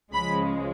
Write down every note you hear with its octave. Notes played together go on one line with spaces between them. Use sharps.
C#2 C#3 F3 G#3 B5